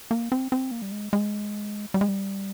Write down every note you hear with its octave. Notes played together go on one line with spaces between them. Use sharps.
A#3
C4
C4
A#3
G3
G#3
G#3
G3
G#3
G3